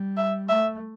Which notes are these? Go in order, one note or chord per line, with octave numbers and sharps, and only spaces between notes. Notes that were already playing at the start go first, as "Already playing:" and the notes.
Already playing: G3
E5
A3 E5